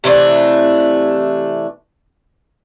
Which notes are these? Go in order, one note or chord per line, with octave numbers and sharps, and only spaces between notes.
C3 E3 A3 D4